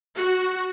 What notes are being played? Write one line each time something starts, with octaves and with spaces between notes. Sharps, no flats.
F#4